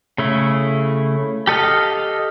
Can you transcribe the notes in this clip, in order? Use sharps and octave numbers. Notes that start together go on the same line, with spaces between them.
C#3 A3 E4
G4 A4 D#5 F5